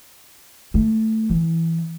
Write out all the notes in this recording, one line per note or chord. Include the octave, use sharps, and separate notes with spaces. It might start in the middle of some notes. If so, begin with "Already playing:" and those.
A3
E3